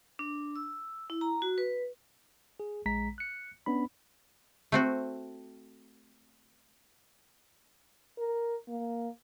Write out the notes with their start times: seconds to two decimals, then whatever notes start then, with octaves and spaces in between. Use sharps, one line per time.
0.19 D4
0.56 E6
1.10 E4
1.21 A#5
1.42 F#4
1.58 B4
2.60 G#4
2.86 A#1 G#3 A#5 B6
3.18 F#6 C#7
3.66 B3 C#4 D4 B5
4.72 A3 C4 F#4
8.18 A#4
8.68 A#3